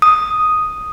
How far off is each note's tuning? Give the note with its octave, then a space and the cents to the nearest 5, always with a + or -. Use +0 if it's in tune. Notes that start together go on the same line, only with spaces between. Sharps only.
D#6 +0